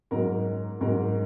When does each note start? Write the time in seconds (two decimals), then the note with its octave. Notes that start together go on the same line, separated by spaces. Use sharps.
0.11 G#2 F#3 A#4
0.81 G#2 F#3 A#4